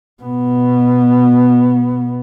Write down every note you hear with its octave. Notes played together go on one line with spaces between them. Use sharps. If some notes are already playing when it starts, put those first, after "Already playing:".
B2 B3